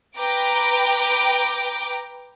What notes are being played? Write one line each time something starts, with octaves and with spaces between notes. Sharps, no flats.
B4 G5 A#5 D6